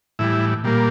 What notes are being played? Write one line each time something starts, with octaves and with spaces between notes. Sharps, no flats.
A2 E3 G3 E4
A#2 G3 A#3